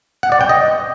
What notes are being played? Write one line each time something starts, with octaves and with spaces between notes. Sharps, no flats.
F#5
D5
G5
D#5